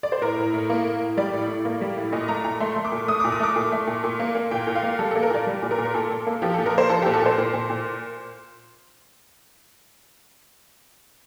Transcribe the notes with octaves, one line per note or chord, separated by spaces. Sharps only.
D5
C5
A2 A#4
A2
A2
A#3
A2
A2
G3 D5
A2
A2
A#3
G3
A2
A#2 D#5
A3 A#5
A#2 A#5
A3 C6
A3
D6
A#2
A3 D#6
A#2 D6
D#6
A3 D6
A#2
A3
A#2
A#2
A#3
A#3
A#2 G5
A#2
F5
A#3
G3 A4
A#3 A4
A#4
A#2 D5
G3
A#2
A#4
A#2
A#4
A#2 A4
A#2
A#3
F3 G4
A#2 A4
A#4
A#3 C5
F3 A4
A#2 G4
A4
A#2 C5
A#2
A#2
A#2